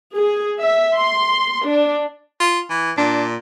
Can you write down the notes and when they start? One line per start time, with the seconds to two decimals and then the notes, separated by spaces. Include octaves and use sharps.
0.15 G#4
0.60 E5
0.97 C6
1.65 D4
2.40 F4
2.70 E3
2.98 A#2 D4